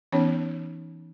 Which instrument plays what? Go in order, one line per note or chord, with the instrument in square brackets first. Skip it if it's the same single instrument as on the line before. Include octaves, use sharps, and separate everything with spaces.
[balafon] E3 B3 C#4 D#4 C#5